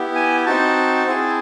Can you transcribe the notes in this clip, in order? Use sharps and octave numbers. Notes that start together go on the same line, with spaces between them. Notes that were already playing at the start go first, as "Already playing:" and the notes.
Already playing: B3 E4 G4
G#5
C4 D#4 F#4 A5
C4 E4 G#4